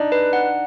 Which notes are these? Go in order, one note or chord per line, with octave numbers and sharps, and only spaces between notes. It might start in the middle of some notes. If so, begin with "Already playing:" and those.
Already playing: D4 D#4
B4
F#5